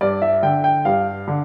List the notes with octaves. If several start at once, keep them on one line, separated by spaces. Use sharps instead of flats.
G2 D5
E5
D3 G5
G5
G2 F5
D3